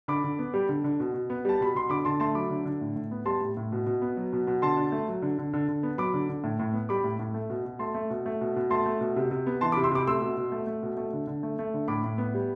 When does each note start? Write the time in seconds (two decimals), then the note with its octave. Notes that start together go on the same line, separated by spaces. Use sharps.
0.08 D3 B5 D6
0.24 D3
0.39 B3
0.54 G3
0.69 D3
0.84 D3
1.00 B2
1.14 B2
1.30 B3
1.45 G3 A5
1.60 B2 B5
1.75 B2 C6
1.89 D3 B5 D6
2.05 D3 A5 C6
2.20 A3 A5 C6
2.35 F#3 B5 D6
2.50 D3
2.65 D3
2.81 A2
2.96 A2
3.11 B3
3.26 G3 A5 C6
3.41 A2
3.57 A2
3.72 B2
3.86 B2
4.02 B3
4.17 F#3
4.33 B2
4.47 B2
4.62 D3 A5 C6
4.77 D3
4.92 A3
5.08 F#3
5.22 D3
5.39 D3
5.54 D3
5.68 D3
5.83 B3
5.98 F#3 B5 D6
6.14 D3
6.29 D3
6.44 A2
6.60 A2
6.73 B3
6.89 G3 B5 D6
7.04 A2
7.19 A2
7.34 A3
7.50 B2
7.65 B2
7.79 A3 A5 C6
7.95 A3
8.10 B2
8.26 A3
8.41 B2
8.56 B2
8.71 A3 A5 C6
8.86 A3
9.01 B2
9.16 C3
9.31 C3
9.46 B3
9.61 E3 A5 C6
9.72 B5 D6
9.76 C3
9.84 C6 E6
9.91 C3 B5 D6
10.07 A3 C6 E6
10.21 B2
10.37 B2
10.52 A3
10.67 A3
10.83 B2
10.97 A3
11.13 D3
11.27 D3
11.43 A3
11.59 A3
11.74 D3
11.88 A2 B5 D6
12.04 A2
12.18 B3
12.34 G3